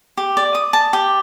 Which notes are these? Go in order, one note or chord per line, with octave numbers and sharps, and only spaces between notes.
G4
D5
D#6
A5
G4